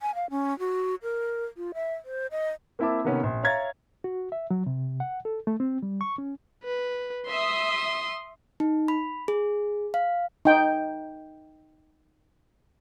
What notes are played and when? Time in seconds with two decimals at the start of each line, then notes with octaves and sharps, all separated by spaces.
0.02 G#5
0.15 F5
0.30 C#4
0.59 F#4
1.03 A#4
1.57 F4
1.74 E5
2.05 C5
2.31 D#5
2.79 A#3 C4 E4 E5 A5 D6
3.04 C3 D#3 A#3 B3 C#4
3.23 A#1
3.43 C#5 E5 F5 A#5 G#6 A6
4.04 F#4
4.32 E5
4.51 F#3
4.66 C3
5.00 F#5
5.25 A4
5.47 A3
5.60 C4
5.83 G3
6.01 C#6
6.18 C#4
6.64 B4
7.28 E5 C6 D#6
8.60 D#4
8.88 B5
9.28 G#4
9.94 F5
10.45 D#4 G5